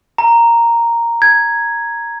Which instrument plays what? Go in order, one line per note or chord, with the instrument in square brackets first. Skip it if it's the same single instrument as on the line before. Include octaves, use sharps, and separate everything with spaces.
[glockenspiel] A#5
G#6